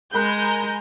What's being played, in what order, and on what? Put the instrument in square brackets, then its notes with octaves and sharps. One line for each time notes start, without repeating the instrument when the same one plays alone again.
[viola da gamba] G#3 [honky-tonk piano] A#4 B5 F#6 [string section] G#5 A#5 G6